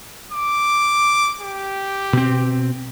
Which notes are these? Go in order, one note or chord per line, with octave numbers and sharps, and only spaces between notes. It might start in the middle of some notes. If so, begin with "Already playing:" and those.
D6
G4
B2 C4